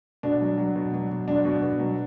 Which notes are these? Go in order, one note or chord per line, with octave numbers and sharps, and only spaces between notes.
B2 D4
F#3
F#3
B2
F#3
B2
F#3 D4
B2
B2
F#3